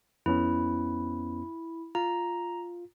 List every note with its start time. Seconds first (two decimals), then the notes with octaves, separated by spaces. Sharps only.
0.26 F2 B3 C#4 E4
1.95 F4 A#5